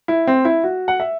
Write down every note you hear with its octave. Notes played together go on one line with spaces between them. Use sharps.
E4
C4
E4
F#4
F#5
E5